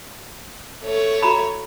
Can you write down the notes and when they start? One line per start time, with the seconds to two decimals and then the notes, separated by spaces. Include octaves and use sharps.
0.84 A3 C#5
1.22 F#4 A#5 B5